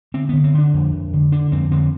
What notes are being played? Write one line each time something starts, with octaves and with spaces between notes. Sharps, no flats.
D3 C4
D3 B3
C4
D3 D4
F2
F2
D3
D3 D4
F2 C4
D3 C4